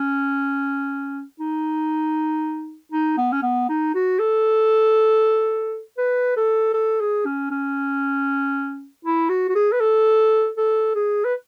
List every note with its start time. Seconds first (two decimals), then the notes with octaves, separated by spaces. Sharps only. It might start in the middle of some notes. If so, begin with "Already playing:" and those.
Already playing: C#4
1.40 D#4
2.92 D#4
3.17 B3
3.32 C#4
3.42 B3
3.69 D#4
3.94 F#4
4.19 A4
5.98 B4
6.36 A4
6.74 A4
7.00 G#4
7.25 C#4
7.51 C#4
9.05 E4
9.29 F#4
9.49 F#4
9.55 G#4
9.72 B4
9.80 A4
10.57 A4
10.95 G#4
11.24 B4